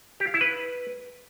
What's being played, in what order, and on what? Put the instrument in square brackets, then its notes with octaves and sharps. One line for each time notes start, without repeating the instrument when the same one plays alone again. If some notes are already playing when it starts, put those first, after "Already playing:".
[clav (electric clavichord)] G4
F5
E4
B4